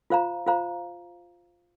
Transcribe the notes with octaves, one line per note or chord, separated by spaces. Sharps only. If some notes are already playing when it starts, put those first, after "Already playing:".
F4 C5 F5 A#5
F4 C5 F5 A#5